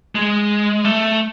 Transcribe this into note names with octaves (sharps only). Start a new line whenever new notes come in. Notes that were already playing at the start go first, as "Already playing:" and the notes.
G#3
A3